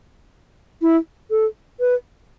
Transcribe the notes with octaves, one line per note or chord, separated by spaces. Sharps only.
E4
A4
B4